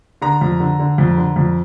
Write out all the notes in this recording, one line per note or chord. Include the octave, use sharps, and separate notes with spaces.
D3 A#5
F2
D3
D3
F2
D3
F2